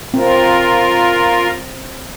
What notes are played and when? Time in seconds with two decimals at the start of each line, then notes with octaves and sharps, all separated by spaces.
0.14 C4 F4 A#4